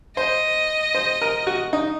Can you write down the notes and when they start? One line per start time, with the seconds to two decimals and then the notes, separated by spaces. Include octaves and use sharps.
0.17 C5 D#5
0.95 C5
1.21 A#4
1.47 F#4
1.73 D#4